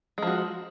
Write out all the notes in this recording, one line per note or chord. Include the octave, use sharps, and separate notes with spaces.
F3 G#3 F#4